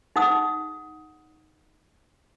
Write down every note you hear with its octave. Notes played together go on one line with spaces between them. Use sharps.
D#4 G#4 F#5 D#6